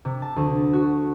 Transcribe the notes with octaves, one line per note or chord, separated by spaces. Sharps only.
C3
A5
D2
F#4